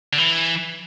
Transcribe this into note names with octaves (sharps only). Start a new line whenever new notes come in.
D3
E3